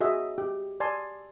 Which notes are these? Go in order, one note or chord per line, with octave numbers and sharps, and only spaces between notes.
F#4 G#4 D#5 E5
G4
D5 G#5 A5 C6